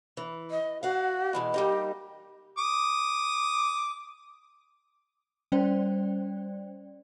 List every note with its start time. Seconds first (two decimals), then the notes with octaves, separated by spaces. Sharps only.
0.17 E3
0.51 D#5
0.83 F#4 F5 F#5
1.33 B2 E3 G#3
1.54 G3 A#3 D#4 G4
2.58 D6 D#6
5.52 G3 C#4 C5 D5 G5